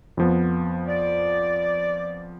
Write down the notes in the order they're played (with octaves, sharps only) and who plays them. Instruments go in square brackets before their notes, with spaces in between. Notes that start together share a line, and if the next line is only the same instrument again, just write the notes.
[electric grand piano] F2 F3 B3
[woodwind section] D5